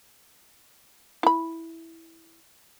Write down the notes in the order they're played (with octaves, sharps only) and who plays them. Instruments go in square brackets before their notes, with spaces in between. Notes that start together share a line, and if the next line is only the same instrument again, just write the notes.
[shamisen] E4 B5